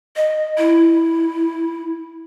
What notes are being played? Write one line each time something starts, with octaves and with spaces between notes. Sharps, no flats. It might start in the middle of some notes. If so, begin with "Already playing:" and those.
D#5
E4